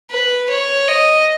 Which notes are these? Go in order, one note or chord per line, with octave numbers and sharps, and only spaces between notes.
B4
C#5
D#5